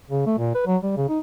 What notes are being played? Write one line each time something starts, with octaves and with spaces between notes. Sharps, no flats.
C#3
A3
A#2
B4
F#3
G3
C#3
D#4